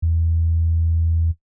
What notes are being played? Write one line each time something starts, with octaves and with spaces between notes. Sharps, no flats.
E2